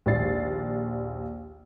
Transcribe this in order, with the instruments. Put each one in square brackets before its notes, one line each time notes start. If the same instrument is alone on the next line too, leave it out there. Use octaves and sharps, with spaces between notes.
[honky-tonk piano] A#1 D#2 A#2 D5 A6 C7